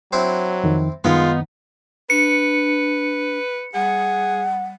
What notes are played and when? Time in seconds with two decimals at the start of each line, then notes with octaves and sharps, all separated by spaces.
0.13 F#3 C4 D4 E4
0.64 F2 D#3
1.04 F#2 D#3 G#3 B3 D#4 F4 D#5
2.10 D4 B4 C#7
3.74 G3 G#4 F#5